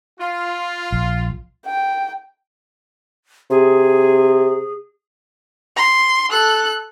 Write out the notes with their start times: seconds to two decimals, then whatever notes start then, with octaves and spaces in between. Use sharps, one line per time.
0.20 F4
0.92 A#1
1.66 G5
3.50 C3 G#4
5.76 C6
6.30 A4 F#6